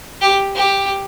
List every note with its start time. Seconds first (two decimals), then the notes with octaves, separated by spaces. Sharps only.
0.21 G4
0.56 G4